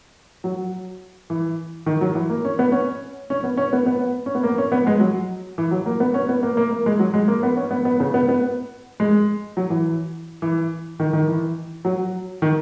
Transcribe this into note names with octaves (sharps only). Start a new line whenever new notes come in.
F#3
E3
D#3
F#3
E3
A#3
C#4
B3
C#4
C#4
B3
C#4
B3
B3
C#4
B3
A#3
C#4
B3
G#3
F#3
E3
F#3
A#3
B3
C#4
B3
A#3
A#3
A#3
G#3
F#3
G#3
A#3
B3
C#4
B3
B3
C#3
B3
B3
G#3
F#3
E3
E3
D#3
D#3
E3
F#3
D#3